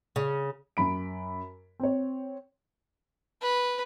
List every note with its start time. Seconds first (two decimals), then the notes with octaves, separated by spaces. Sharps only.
0.16 C#3
0.77 F#2 B5 D7
1.80 C4 C#5
3.42 B4